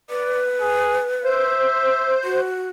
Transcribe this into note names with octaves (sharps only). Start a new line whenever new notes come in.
B4 D5
G#4
C5 E5
F#4